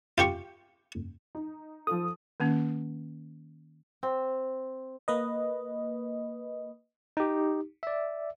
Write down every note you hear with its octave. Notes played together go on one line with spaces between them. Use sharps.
F4 G4 C#6
D#4
F3 F4 A4 D#6
D#3 A#3 C#4
C4
A#3 B4 D#5
D#4 G4
D5 E5